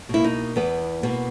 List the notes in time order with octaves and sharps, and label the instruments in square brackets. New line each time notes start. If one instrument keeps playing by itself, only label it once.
[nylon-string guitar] B2 A#3 E4
D#4
E2 B3
B2 A#3 B3